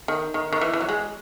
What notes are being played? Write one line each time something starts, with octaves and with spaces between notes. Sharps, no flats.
D#3
D#3
D#3
E3
E3
F#3
G#3